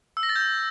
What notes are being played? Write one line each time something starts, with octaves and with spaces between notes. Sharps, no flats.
E6
A#6
A6
G6